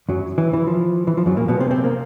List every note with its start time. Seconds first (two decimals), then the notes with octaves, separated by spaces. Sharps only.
0.09 F#2 F#3
0.38 E3
0.53 E3
0.67 F3
1.07 E3
1.17 F3
1.26 F#2 F#3
1.37 A#2 A#3
1.48 B2 B3
1.60 C3 C4
1.70 C3 C4
1.84 A#3